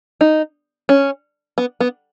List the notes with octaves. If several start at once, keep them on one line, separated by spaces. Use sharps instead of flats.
D#4
C#4
B3
B3